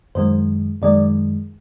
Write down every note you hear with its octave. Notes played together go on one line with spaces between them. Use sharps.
F#2 D#3 G#3 C5
F#2 D#3 G#3 D5